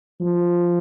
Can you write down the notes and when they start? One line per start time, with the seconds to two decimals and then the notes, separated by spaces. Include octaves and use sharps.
0.20 F3